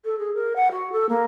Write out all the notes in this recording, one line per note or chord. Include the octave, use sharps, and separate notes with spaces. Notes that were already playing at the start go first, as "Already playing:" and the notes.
A4
G#4
A#4
F#5
F#4
A4
A#3